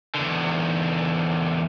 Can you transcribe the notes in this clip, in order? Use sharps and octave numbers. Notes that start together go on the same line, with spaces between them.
E2 D3